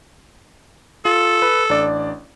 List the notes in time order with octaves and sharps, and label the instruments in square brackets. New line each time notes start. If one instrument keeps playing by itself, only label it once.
[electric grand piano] F4 [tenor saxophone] A4
[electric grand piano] B4
A1 D4 D5